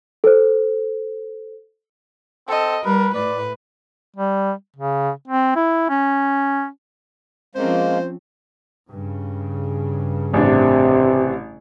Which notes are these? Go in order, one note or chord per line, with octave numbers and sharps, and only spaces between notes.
A4 C5
C4 A4 D#5
G3 A#4 B4
A2 B4 D5
G3
C#3
C4
E4
C#4
F3 G#3 A#3 C4 C#4 C5
G2 C#3
A1 C3 D4